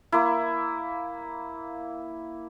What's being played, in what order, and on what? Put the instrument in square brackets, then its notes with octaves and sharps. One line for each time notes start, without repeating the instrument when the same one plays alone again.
[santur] A#3 E4